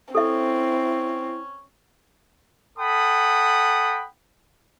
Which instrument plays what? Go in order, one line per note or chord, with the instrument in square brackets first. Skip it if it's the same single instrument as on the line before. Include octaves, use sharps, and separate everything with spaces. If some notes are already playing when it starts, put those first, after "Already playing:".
[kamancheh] C4 [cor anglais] C#4 [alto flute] E4 [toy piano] A4 E5
[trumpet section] A4 F#5 G5 B5 D#6